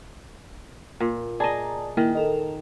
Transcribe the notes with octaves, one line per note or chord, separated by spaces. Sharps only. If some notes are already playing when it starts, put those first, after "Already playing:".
A#2
G#4 D5 D#5 A5 A#5
D#3 A#3 E4
A4 A#4 D#5